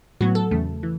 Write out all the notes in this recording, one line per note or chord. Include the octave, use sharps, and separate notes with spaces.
A2 F#3 B3 F#4
A4
E2 C#3 A3
E3